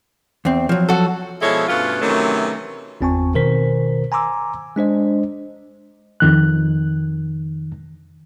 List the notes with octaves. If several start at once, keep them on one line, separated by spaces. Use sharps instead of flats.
E2 C4
F3 F#3
F#4 A4
B2 F3 G#3 E4 A4 C#5
G2 B2 A3 C#4 F4
C3 D#3 E3 F#3 A3 C#4
G1 E2 C4 G#5 A5 C#6
B2 D#3 A#4 C5 B6
G#5 A#5 C6 D6 E6
G#3 D4 C5 D#5
F2 D#3 F#6